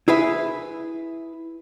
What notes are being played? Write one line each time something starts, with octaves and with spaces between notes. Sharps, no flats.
E4 G#4 B4 E5